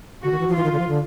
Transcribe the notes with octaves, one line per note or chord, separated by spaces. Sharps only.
D3 F#4
D#3
E3
F3
E3 F4
D#3
D3
F3
D3